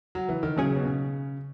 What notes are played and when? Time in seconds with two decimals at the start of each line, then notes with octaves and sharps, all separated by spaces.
0.15 F#3
0.29 E3
0.43 D#3
0.56 A#2 C#3 F#3 C#4 G#4
0.76 B2
0.85 C#3